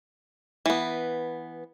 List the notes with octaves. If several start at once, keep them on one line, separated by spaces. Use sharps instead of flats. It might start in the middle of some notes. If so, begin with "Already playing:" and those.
E3 B3